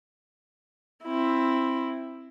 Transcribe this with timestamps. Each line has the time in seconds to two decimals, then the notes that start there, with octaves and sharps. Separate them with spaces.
1.05 C4 E4